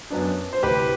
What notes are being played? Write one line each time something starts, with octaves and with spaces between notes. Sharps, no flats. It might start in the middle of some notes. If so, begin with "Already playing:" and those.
F#2 F#3 B3 D4
C5
D2 C3 E3 G4 B4